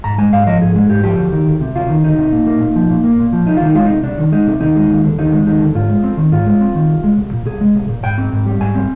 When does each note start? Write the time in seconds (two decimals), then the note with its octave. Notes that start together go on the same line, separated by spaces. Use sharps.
0.04 G#2 A#5
0.18 G#3 G#5
0.33 G#2 F5
0.47 F3 D#5
0.62 G#2 G#4
0.75 G#3 G#4
0.90 G#2 G4
1.04 F3 G4
1.18 D2
1.32 D#3
1.46 D2
1.61 C3
1.75 D2 F4
1.89 D#3
2.04 D2 D#4
2.18 C3
2.32 A#2
2.47 A#3
2.61 A#2
2.75 F3
2.90 A#2
3.04 A#3
3.19 A#2
3.33 F3
3.46 C2 D#4
3.56 D#3 F4
3.66 D#4
3.75 G#3 F4
3.85 C3 D#4
4.03 C2 D4
4.18 D#3
4.32 G#3 D#4
4.47 C3
4.61 D#2 D#4
4.76 G#3
4.89 D#2
5.04 D3
5.18 D#2 D#4
5.32 G#3
5.46 D#2 D#4
5.61 D3
5.75 G#2 F4
5.90 G#3
6.04 C4
6.18 D#3
6.32 G#2 F4
6.46 G#3
6.61 C4
6.75 D#3
6.89 C2
7.04 G#3
7.18 C2
7.33 A#2
7.46 C2 G#4
7.61 G#3
7.75 C2
7.89 A#2
8.04 G#2 G5
8.18 C4
8.32 G#2
8.46 G3
8.61 G#2 G#5
8.75 C4